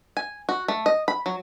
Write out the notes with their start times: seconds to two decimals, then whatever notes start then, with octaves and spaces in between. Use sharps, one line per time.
0.17 G#5
0.49 F#4
0.68 A3
0.86 D#5
1.08 B5
1.26 F#3